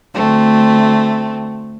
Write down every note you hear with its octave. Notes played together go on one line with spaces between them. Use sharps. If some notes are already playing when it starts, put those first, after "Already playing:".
D2 A3 C4